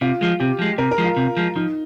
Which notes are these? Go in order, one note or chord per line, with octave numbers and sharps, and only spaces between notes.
C3 F4
F3 G#3
C3 G4
F3 G#3
C3 A#4
A#4
F3 G#3
F4
C3
F3 G#3
F3 D#4